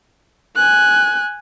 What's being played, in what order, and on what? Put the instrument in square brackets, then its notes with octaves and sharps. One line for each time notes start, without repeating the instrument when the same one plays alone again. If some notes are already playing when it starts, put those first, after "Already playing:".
[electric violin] G#5 F#6